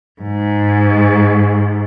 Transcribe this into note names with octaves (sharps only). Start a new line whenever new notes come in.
G#2